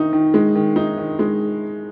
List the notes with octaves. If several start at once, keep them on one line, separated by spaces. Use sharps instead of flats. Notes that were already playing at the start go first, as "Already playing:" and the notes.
Already playing: D#3 D#4
D#3
G#3
D#3
D#4
D#3
G#3